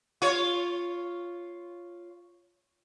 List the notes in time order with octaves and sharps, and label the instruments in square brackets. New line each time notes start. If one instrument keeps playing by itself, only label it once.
[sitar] F4 C#5